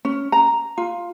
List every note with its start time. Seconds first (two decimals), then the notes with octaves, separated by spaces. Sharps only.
0.05 C#4
0.32 A#5
0.78 F4